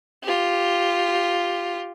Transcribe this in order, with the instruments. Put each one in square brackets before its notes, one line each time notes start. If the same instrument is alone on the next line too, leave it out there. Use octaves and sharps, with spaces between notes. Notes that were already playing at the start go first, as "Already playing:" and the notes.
[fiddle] F4 G4